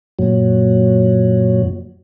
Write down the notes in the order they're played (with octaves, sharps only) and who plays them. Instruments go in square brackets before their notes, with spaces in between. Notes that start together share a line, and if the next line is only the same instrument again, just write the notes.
[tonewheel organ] F#2 A#2 F#3